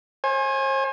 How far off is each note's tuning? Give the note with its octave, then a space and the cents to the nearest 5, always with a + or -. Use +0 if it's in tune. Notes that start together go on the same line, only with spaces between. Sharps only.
C5 +45 G#5 +0